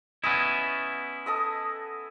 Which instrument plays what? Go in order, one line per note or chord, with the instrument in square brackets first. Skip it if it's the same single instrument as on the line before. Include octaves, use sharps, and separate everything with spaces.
[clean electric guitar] B3 C#4 E4 [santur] D#5
[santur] A4 D#5 D#6